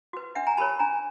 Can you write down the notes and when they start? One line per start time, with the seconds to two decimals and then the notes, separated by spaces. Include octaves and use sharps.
0.13 F#4 B4
0.35 D4 E5 F#5
0.47 G#5 A#5
0.57 G4 A#4 C#5 A5 B5
0.79 D4 G#5 A#5